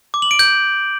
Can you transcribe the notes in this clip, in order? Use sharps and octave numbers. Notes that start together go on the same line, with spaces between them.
D6
F#7
D7
G6